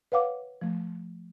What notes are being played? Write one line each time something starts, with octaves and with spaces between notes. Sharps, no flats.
B4 C#5 F5 F#5 D6
F3 A3